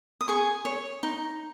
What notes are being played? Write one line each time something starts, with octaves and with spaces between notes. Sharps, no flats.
D#6
G#4 G#5 C#6
C#5
D#4